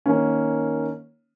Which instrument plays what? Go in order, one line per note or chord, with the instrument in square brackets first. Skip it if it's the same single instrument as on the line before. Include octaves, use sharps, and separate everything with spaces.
[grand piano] D#3 A#3 C#4